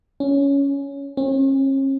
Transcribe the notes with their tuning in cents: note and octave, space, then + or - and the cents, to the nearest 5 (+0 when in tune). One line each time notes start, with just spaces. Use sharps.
C#4 +10
C#4 -40